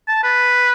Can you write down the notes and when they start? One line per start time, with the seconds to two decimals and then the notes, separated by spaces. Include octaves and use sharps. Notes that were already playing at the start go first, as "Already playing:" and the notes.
0.08 A5
0.23 B4